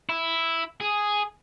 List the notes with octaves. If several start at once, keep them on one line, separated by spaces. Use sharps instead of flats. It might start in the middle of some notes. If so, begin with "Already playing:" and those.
E4
G#4